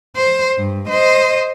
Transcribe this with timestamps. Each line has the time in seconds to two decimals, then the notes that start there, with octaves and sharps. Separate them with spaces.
0.16 C5
0.58 G2
0.88 C5 D#5